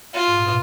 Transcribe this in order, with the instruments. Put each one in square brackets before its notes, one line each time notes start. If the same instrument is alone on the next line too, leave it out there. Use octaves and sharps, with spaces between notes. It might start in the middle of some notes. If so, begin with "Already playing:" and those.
[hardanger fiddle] F4
[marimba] G#2
A#2
B2